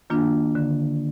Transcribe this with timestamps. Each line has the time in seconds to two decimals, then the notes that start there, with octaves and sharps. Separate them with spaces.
0.10 D#3 A#3 D4 F4
0.55 D3